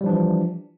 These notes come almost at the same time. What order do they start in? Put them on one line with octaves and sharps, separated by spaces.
G3 F3 D4 E3